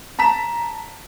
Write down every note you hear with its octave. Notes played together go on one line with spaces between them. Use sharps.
A5 A#5 B6 E7